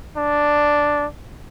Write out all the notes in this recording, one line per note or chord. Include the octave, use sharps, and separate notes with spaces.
D4